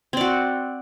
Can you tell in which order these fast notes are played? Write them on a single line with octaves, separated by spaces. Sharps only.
C4 D5 F#4